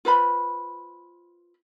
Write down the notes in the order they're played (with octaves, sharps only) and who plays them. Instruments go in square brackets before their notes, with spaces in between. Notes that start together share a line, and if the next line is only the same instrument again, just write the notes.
[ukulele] F4 B4 C5 B5